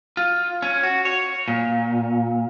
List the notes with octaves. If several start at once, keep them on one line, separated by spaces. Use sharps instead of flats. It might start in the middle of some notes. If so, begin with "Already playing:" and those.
F4
C#4
F#4
C#5
A#2